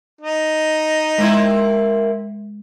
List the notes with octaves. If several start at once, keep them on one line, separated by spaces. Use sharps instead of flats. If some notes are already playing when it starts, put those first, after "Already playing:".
D#4
G#3 A#3 C4 E4